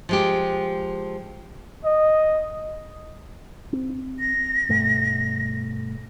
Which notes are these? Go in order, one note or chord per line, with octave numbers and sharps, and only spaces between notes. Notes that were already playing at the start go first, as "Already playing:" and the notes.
F3 G#3 G4
D#5
C4
A#6
G2 B2 A3